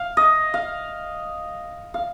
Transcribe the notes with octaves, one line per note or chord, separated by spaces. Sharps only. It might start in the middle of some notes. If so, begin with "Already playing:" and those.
Already playing: F5
D#5
F5
F5